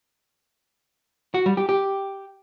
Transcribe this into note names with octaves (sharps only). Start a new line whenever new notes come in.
F#4
G3
G4
G4